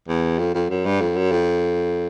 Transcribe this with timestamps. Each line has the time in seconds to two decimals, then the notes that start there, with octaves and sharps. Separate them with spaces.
0.08 E2
0.39 F2
0.54 F2
0.70 F#2
0.85 G2
1.01 F2
1.16 F#2
1.31 F2